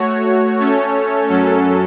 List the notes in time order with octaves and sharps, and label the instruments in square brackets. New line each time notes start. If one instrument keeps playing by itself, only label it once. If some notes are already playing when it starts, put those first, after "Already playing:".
Already playing: [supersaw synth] A3 F#4 C#5
A3 C#4 A4 C#5
F#2 F#3 C#4 A4